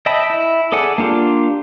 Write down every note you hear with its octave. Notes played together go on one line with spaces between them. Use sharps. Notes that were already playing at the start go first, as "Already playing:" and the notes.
D#5 E5 G5 A5 B5
E4
G#4 A4 D5 F#5 G#5
A#3 D4 F4 G4